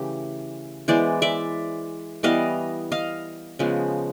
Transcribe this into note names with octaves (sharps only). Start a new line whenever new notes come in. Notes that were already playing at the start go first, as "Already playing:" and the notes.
Already playing: C#3 E3 A3 G4
E3 G#3 B3 C5 D5
D5 E5
E3 G3 B3 D#5 F5
D#5 F5
C#3 F3 G#3 B3